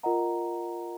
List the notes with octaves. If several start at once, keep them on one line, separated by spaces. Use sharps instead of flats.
F4 A#4 D#5 F#5 A#5